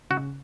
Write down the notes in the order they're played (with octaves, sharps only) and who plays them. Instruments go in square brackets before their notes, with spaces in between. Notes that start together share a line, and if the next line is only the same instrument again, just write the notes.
[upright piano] C#3 [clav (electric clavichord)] F#4